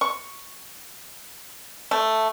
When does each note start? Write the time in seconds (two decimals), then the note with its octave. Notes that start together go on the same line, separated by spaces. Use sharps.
0.01 C#6
1.91 A3